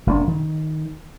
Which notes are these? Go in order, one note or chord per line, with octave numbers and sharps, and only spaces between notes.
F#1 F#2 A#3 D4
D#3